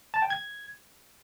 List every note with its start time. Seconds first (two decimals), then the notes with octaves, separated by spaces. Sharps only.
0.14 A5
0.22 G5
0.30 G#6